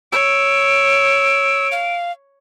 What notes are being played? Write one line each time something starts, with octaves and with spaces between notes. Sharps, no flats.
C#5 E6 D7
F5